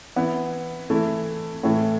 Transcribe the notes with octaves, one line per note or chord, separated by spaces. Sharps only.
E3 B3 E4
E3 A3 E4
A2 E3 A3